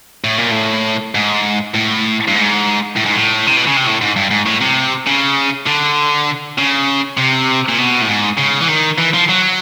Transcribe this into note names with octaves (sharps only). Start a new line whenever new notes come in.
A2
A#2
A2
G#2
A2
G2
G#2
A2
G#2
A2
C3
B2
C#3
C3
A2
G#2
G2
G#2
A2
C3
C#3
D3
C#3
C3
A#2
B2
A2
G#2
C#3
E3
D#3
E3
F3
F#3